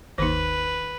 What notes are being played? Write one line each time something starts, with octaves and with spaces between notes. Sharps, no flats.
G1 D#2 D#3 D#4 B4